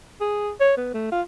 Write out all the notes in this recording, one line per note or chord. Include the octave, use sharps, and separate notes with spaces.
G#4
C#5
B3
A3
F4